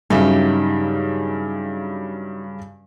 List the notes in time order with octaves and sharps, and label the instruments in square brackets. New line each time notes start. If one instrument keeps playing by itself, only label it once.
[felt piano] G2 C#3 F#3 [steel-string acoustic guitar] D#4 G4 E5